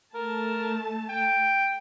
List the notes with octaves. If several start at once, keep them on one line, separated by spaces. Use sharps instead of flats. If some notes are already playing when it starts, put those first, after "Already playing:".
A3 A#4 A5
G5